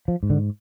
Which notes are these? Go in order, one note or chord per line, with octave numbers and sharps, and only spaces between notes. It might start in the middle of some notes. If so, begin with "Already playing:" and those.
F3
G#2
D3